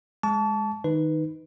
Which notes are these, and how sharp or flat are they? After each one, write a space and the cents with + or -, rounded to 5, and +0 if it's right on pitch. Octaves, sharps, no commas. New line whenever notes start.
G#3 +0 A5 -10 C#6 +45
D#3 +0 D#4 +0 B4 +0